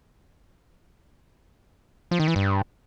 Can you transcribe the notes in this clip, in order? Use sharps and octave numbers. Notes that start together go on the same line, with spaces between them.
F3
D#3
E3
G2